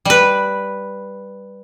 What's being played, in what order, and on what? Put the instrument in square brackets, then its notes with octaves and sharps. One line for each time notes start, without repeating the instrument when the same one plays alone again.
[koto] G3 B4